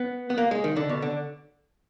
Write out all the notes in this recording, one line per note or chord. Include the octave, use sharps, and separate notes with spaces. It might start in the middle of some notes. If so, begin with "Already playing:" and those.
Already playing: B3
B3
A#3
G#3
D#3
D3
B2
D3